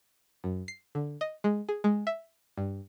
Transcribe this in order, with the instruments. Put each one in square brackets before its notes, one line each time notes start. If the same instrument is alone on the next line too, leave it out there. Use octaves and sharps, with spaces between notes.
[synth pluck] F#2
C7
D3
D#5
G#3
G#4
G#3
E5
G2